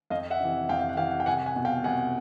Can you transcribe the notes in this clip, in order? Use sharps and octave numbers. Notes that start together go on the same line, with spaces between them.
F2 D#5 F5
E5 F#5
C3 E3
F2 F5 G5
F5
F#5
C3 E3 F5 G5
F#5
G5
C2 F#5 G#5
F#5 G#5
B2
F5 G5
C2 F#5 G#5